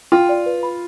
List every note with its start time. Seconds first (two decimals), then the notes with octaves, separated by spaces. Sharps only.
0.12 F4 G5
0.29 D5
0.46 B4
0.63 B5